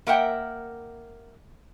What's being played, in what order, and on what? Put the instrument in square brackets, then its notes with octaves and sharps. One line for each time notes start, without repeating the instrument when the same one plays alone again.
[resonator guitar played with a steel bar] A#3 A#4 E5 F#5 G5